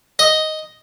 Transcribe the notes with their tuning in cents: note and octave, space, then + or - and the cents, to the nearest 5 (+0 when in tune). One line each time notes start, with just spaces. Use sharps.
D#5 +0